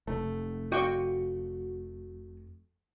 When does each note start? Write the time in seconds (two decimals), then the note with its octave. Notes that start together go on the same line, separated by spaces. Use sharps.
0.07 F1 A3
0.72 F4 F#4 D5 D#5 G5 C#6